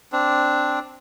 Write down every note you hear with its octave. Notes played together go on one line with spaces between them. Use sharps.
C4 D4